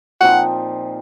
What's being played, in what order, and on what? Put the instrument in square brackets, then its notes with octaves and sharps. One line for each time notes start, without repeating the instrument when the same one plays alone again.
[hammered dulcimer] A#2 F3 C4 D#4 [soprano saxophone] F#5